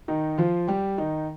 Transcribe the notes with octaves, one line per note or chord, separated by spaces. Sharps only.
D#3 D#4
F3 F4
G3 G4
D#3 D#4